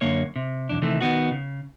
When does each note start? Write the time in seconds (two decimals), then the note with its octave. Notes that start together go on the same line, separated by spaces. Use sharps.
0.01 F#2 D3 A#3 C#5
0.36 C3
0.69 B1 E2 D4
0.82 C3 D#3 E3 A3
1.01 D#3 B3 F#4
1.31 C#3